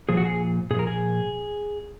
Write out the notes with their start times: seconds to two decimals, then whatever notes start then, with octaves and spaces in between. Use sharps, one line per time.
0.09 A#2 F3 G#4
0.17 F#4
0.25 G#4
0.71 A#2 F3 G#4
0.79 A#4
0.87 G#4